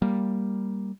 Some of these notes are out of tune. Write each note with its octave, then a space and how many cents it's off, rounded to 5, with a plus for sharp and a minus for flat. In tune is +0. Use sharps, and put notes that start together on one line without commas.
G3 +0 A#3 +0